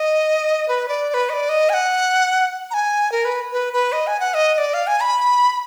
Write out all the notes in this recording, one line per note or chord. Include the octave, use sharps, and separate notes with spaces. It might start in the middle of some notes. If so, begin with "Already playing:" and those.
Already playing: D#5
B4
D5
D5
B4
D#5
D5
D#5
G#5
F#5
A#5
G#5
A#4
B4
B4
B4
D#5
G#5
F#5
D#5
D#5
D5
F5
G#5
B5